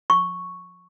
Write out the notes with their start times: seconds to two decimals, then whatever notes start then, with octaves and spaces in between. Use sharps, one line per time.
0.10 C#6